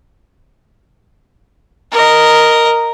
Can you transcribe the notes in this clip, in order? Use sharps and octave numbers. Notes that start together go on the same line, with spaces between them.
A#4 D#5